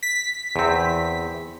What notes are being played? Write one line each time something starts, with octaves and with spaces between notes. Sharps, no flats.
B6
E2 C4